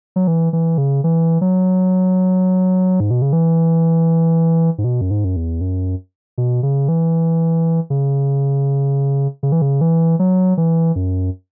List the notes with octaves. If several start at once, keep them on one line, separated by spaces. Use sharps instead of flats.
F#3
E3
E3
C#3
E3
F#3
G#2
B2
C#3
E3
G#2
B2
F#2
G#2
F#2
E2
F#2
B2
C#3
E3
C#3
C#3
E3
C#3
E3
F#3
E3
F#2